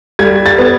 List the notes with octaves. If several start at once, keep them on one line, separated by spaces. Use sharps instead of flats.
G3 G#6
A6
B3